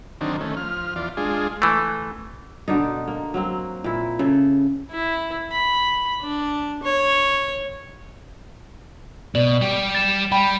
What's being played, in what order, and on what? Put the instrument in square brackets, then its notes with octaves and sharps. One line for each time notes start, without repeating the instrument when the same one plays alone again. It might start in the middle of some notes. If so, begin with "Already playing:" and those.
[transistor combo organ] D3 D#3 F#3 C4 D4 D#4
D#3 A3 C#4
F3 F6
E2 F4 D5
G#3 D4 F4 G#4
[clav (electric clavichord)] E3 A3
[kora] B2 D3 D4 D#4
A#3
F#3 A#3 C4
A#2 E4
C#3 A4
[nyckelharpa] E4
B5
D4
C#5
[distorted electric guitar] B2 [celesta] D5 F#7
[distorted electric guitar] G3 G4
[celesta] A6 E7
[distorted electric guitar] G3 [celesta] G5 B5